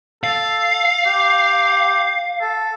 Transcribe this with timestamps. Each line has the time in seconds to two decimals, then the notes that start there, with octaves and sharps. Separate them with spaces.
0.24 A4 F5
1.06 G4
2.41 A4